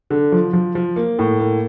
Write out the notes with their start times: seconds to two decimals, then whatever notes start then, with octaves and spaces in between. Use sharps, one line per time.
0.10 D3
0.32 F3
0.53 F3
0.75 F3
0.96 A#3
1.19 A2
1.40 A#3